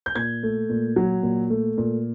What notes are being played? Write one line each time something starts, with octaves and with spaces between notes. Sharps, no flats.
G6
A#2 G#6
A3
A#2
F#3
A#2
A3
A#2